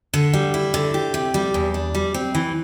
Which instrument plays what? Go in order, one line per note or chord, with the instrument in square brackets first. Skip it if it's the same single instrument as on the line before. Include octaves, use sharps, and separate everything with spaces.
[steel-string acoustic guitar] D3
G3
E4
D3
G4
C3
G3
E2
D4
G3
C4
E3